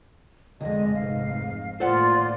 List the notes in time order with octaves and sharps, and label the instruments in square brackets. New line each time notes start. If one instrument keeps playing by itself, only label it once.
[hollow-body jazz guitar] C2 F2 [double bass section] D3 G#3 [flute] D#5
[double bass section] F1 G#2 [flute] F5
[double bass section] A2 D#3 A#3 [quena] F4 [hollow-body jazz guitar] A4 C5 F#5 [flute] D5